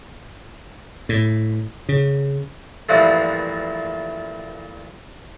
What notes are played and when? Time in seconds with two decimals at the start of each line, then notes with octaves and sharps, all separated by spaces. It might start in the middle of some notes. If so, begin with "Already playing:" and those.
1.09 A2
1.89 C#3
2.89 G2 A#2 E3 F3 A3